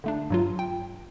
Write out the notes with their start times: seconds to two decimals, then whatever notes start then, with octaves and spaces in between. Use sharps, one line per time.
0.04 D3 A3 D4
0.30 G2 F#3 F4
0.59 G5